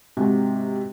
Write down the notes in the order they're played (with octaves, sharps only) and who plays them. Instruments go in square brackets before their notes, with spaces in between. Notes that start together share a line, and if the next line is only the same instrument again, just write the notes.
[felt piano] G#2 C3 F#4